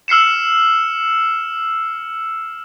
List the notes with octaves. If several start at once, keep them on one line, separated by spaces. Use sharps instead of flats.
E6 F6 C7 C#7 E7